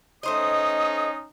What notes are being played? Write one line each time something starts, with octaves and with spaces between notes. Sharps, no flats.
A3 C#4 D#4 C5 D#5 D#6